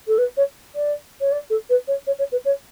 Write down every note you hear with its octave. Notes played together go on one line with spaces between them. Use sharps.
A4
B4
C#5
D5
C#5
D5
A4
B4
C#5
C#5
C#5
B4
C#5